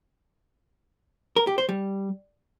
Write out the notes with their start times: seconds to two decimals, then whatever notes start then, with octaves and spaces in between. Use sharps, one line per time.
1.36 A#4
1.47 G4
1.58 C5
1.69 G3